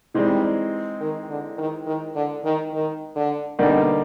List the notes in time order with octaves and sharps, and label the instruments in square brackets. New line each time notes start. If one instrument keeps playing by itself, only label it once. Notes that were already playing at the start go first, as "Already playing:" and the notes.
[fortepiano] E3 G#3 C4 D#4 [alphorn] G3
[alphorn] D#3
D3
D#3
D#3
D3
D#3
D#3
D3
[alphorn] B2 [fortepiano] D3 G3 A#3 D#4